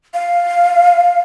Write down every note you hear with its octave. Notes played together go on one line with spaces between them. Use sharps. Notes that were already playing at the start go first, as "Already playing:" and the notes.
F5